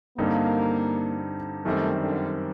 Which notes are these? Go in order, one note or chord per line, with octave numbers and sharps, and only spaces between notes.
G2 D3 G3 A#3 C4 D#4
F#2 D#3 G3 A3 C4
D3